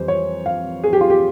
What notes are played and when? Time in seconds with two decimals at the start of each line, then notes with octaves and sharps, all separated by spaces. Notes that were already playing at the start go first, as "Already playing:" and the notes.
Already playing: F2 E3 G3 C5
0.08 C#5
0.46 F5
0.84 G#4
0.93 G4
1.01 F4
1.10 G4